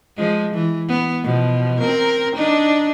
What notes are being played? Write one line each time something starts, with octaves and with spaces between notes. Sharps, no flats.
F3 G#3
E3
B3
B2 F3
C4 A#4
D4 D#4